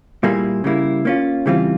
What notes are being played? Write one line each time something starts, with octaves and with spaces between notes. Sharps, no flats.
A#2 G3 A#3 E4 G#4
C#3 G3 A#3 E4
A#3 C#4 F4
C#3 E3 G3 C4 F4